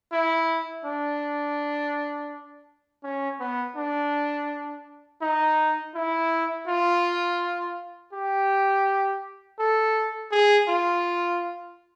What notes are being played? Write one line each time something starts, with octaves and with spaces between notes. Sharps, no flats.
E4
D4
C#4
B3
D4
D#4
E4
F4
G4
A4
G#4
F4